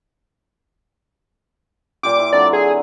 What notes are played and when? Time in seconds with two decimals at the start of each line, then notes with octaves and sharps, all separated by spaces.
2.03 A#2 F4 G4 D6
2.19 E4
2.33 D3 F#3 C4 D5
2.53 G#4